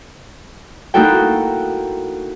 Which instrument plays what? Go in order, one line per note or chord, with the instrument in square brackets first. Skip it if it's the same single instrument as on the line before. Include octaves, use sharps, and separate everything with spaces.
[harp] A#3 D#4 E4 F#4 A4 G5